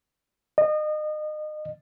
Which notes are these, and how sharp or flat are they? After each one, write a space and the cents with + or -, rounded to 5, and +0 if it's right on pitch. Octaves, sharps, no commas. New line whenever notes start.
D#5 -30